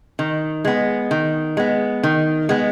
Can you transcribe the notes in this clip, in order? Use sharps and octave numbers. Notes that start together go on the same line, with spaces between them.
D#3
G#3 B3
D#3
G#3 B3
D#3
G#3 B3